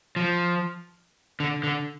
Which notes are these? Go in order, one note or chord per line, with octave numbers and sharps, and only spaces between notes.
F3
D3
D3